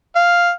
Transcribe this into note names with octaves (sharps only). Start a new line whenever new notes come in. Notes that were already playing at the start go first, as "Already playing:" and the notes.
F5